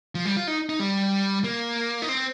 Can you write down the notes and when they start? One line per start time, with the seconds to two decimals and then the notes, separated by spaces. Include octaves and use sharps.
0.15 F3
0.25 G3
0.37 F4
0.47 D#4
0.69 D#4
0.79 G3
1.44 A#3
2.02 D#4
2.09 C4